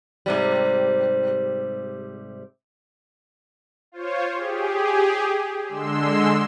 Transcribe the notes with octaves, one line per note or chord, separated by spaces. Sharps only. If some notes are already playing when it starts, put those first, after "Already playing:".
G#2 C3 G3
F4 C5 C#5
G4 G#4
D3 G#3 C6 E6